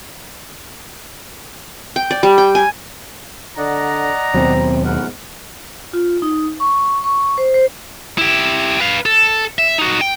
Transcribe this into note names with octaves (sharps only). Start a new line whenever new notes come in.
G5
D5
G3
G5
G#5
D3 D5 D#5 F#5 A#5
D#2 B2 F#3 C4
G#2 A#4 F#5
F4
D#4
C#6
C#6
C5
C5
E4 G4
B4 F5
A4
E5
D#4 F#4
G5